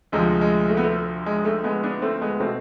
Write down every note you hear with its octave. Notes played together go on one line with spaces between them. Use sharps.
D2 C3 F3 G#3
G#3
A3
B3
A3
G#3
A3
G#3 B3
B3 D4
A3 C4
G#3 B3
B2 A3 C4